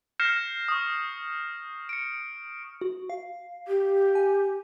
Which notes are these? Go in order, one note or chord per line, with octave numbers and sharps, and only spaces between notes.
F6 G6 A#6 C7 C#7 E7
C#6 D#6
C#7 D7
F#4
F5
G4
G#5